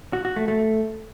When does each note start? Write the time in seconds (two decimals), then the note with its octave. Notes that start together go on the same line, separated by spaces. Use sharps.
0.13 F#4
0.25 F#4
0.36 A3
0.48 A3